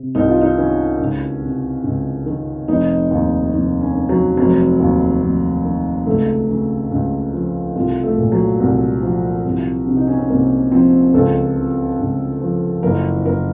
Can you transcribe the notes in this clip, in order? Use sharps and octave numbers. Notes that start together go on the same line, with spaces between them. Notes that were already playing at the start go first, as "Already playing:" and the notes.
Already playing: C3
C2 D#4
F4
D#4
D#3 C#4
C#2
C3
C#2
D#3
F1 D#4
D#2
F1 D#4
C#4
D#3
F#3
F1 F#3
D#2
F1
D#3
C#2 A3
C#3
C#2
F3
C2 F4
A3
A#2
F#3
C2
F3
C2
C3
D#4
C#4
C4
C2 A#3
F3 C4
C#2 A4
C#3
C#2
F3
F#1 A#4
F#2 A#4